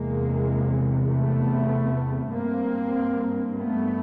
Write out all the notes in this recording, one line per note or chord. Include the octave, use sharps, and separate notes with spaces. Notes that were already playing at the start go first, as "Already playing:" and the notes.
Already playing: E2 C3 G#3 A#3
A3 B3
G2 A#3 C4
A3 B3